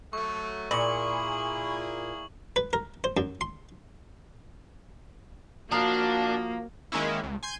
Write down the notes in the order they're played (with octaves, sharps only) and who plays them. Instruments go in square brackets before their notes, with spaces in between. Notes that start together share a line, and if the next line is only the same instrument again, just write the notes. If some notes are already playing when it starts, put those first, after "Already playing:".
[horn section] F#3 A3 [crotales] C#6
[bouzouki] A#2 [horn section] A#3 E4 G#4 [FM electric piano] B5 C#6 [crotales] F#7
[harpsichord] B4
A#4
C5
F#2
C6
[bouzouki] F3 A#4 F5 [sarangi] A#3 [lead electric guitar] D4 [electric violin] F#4
[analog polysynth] D#3 G#3 A#3 C#4 E4
C#2
G#5 C6 G6 G#6